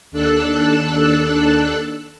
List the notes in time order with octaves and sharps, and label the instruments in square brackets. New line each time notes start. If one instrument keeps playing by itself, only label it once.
[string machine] D#2 D4 A4 E6 F#6